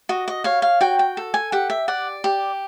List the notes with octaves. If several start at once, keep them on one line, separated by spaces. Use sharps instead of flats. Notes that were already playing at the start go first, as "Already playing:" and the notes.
F#4 D#5
D#5
C#5 F5
F5
F#4 G5
G5
A4
G#5
G4 F#5
E5
D5 F#5
G4